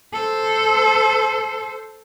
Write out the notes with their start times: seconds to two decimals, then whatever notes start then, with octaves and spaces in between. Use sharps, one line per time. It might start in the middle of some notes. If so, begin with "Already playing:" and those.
0.13 A4 C5